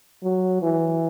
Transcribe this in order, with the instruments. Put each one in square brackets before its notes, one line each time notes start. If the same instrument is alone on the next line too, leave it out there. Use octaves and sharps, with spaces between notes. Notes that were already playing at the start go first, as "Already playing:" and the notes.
[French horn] F#3
E3